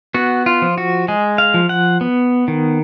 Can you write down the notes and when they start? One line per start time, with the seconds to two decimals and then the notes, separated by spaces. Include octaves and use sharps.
0.14 B3 F#4
0.46 F4
0.62 F3
0.78 F#4
1.08 G#3 G#4
1.38 F5
1.54 F3
1.69 F#5
2.01 B3
2.48 D#3